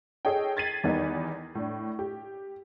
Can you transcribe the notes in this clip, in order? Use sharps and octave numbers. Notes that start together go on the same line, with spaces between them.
G#4 A4 C#5 D#5 G5
G#6 A6 B6 C7 D#7 F#7
E2 D#3 G3 B3 D#4
A2 D4
G4